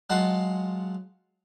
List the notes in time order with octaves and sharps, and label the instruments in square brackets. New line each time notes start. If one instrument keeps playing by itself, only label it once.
[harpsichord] F#3 G#3 F4 F#5 A5 C6